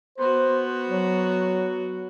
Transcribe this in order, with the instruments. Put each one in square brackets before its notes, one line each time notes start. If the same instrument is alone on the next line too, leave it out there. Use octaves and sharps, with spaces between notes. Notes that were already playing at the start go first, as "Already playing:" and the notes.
[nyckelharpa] B3 F#4 [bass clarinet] C5
[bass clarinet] F#3